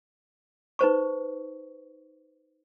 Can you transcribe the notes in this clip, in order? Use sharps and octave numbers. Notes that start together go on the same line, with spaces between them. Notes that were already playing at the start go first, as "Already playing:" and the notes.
D#4 B4 C5 C#6